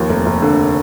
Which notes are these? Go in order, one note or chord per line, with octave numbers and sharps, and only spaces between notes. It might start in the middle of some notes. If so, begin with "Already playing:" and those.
Already playing: D#2 F3
F1
F1
D3